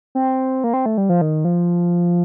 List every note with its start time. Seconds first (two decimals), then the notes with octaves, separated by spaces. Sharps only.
0.15 C4
0.64 A#3
0.74 C4
0.86 A3
0.98 G3
1.09 F3
1.21 D#3
1.45 F3